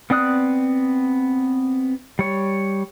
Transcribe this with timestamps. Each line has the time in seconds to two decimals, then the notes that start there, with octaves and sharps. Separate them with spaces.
0.10 B3 C4 D5 D#6 F#6
2.19 G3 C#5